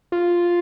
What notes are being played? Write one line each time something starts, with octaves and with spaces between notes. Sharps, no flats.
F4